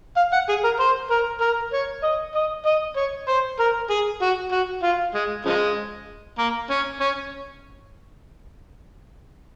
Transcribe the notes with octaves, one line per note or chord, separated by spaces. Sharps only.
F5
F#5
G#4
A#4
C5
A#4
A#4
C#5
D#5
D#5
D#5
C#5
C5
A#4
G#4
F#4
F#4
F4
G#3
C#3 F3 G#3
A#3
C#4
C#4